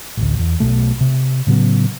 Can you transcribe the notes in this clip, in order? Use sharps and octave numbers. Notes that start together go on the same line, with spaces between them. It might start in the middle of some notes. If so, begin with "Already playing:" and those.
A1 D2
E2
B1 F2 B2 A3
C3
A2 C#3 F#3 B3